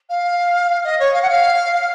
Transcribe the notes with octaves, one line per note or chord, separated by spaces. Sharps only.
F5
D#5
C#5
F5
F#5
F5
F5